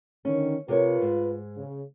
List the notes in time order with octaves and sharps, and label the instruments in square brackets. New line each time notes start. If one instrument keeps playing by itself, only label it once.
[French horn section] D3 D#3 [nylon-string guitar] C#4
[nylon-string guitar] C3 A#4 C#5 [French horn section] F4 B4
[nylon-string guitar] G#2
[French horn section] C#3